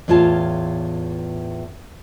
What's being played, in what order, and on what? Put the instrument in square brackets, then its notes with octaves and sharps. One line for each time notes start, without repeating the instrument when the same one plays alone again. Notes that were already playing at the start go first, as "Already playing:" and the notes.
[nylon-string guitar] E2 A2 F4 C#5 A5